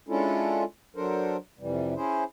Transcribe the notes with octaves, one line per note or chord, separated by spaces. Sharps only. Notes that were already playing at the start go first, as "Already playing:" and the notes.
G#3 C#4 D4 E4 F4 A4
F#3 D4 A4 A#4 C5
F2 C3 E3 G3
C#4 E4 G#4 C5